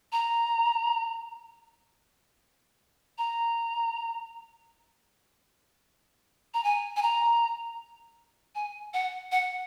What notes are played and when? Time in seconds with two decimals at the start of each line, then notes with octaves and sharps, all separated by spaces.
0.12 A#5
3.18 A#5
6.54 A#5
6.64 G#5
6.96 G#5
7.02 A#5
8.55 G#5
8.94 F#5
9.32 F#5